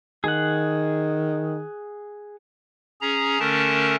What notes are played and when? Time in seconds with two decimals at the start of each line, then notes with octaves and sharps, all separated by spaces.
0.24 D#3 G#4 F#5
3.01 C#4 G#4 A#5
3.39 D3 A3 C#4 A#4 A5